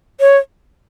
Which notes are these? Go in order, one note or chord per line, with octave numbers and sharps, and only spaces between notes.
C#5